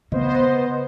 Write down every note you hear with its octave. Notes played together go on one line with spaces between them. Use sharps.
C#3 B3 C5 D#5